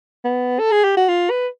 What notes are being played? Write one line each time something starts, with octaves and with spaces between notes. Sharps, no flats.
B3
A4
G#4
G4
F#4
F4
B4